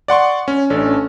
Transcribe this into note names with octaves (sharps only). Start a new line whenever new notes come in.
D5 F#5 C6 C#6
C#4
A1 C#4 D4 A4